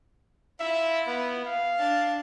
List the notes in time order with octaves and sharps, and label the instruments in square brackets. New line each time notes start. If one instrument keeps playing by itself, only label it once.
[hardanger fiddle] E4 F4 [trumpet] E5
[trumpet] B3
F5
[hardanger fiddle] D4 A5